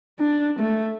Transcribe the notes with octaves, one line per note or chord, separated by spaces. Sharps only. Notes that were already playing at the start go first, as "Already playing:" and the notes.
D4
A3